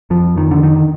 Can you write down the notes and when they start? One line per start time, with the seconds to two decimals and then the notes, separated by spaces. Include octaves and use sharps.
0.10 F2 F3
0.36 F2 D#3
0.51 D3
0.63 D3 D#3